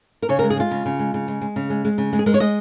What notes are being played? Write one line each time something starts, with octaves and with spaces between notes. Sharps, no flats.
A#4
C#3 C#5
A#4
G#3
G#4
G#3 F4
C#3
C#3
G#3
C#3
G#3
G#3
C#3
G#3
G#3
C#3
G#3
G#4
G#3 A#4
C#5
G#3 D#5